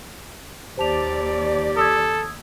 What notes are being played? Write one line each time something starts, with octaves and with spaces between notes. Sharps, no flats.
D#2 G4 C5 D5 A5 F7
A4 D#6 E6 G#6